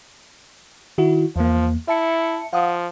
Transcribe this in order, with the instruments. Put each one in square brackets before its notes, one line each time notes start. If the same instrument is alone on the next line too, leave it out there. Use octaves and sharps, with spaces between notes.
[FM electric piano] D#3 E4 F#4
[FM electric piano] E2 A#3 [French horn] F3
[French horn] E4 [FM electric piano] E5 A5 C#7
[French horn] F3 [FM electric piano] F5 F#5 D#6